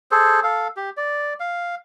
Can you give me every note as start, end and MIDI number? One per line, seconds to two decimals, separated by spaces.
0.11 0.40 68
0.11 0.40 69
0.11 0.40 72
0.43 0.68 69
0.43 0.68 77
0.77 0.90 67
0.97 1.34 74
1.40 1.75 77